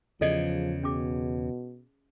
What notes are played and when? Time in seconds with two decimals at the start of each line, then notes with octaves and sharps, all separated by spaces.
0.21 E2 C#3 F3 A4 D5 D#5
0.83 B2 C#4 G#4 D6